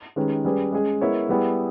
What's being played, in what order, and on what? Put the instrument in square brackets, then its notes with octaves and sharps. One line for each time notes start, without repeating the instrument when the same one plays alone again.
[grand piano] D#3 G#3 C#4 G4 B4
G3 C#4 G#4 B4
G#3 C#4 G#4
G#3 B3 E4 A#4 C#5
G3 B3 E4 G#4